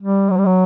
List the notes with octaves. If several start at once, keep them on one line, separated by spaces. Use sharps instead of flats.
G3
F#3
G3
F#3